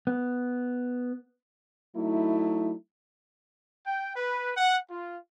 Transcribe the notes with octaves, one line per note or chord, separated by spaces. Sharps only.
B3
F#3 A3 D#4 E4
G5
B4
F#5
F4